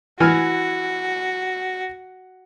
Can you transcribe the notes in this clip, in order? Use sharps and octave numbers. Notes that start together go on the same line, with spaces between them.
E3 F#4 G#5 F6